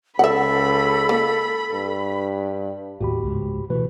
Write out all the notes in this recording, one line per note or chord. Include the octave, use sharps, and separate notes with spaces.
C#2 A4 E5 F#5 B5
A#3
G2
D#2 A2 F#4 G4 B5
C#2 G#2 G#3
B2 E3 A3 B4